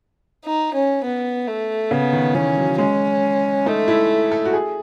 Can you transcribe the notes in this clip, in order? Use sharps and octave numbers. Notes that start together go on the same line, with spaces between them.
D#4
C#4
B3
A3
C#3 B3
D#3
E3 C#4
F#3
G#3 C#4
A3 D#4
E4
A4
F#4
G#4